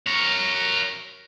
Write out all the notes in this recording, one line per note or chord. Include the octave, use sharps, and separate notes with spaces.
A#4 C#5